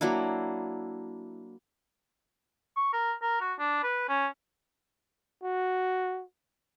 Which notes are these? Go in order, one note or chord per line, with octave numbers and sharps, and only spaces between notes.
F#3 A#3 D4 E4
C#6
A#4
A#4
F#4
D4
B4
C#4
F#4